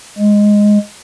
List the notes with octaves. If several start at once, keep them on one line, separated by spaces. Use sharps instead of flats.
G#3